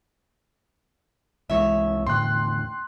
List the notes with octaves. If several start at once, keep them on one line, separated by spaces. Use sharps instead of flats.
C2 E3 G#3 C#5 E5
E2 A2 D3 G5 C6 F#6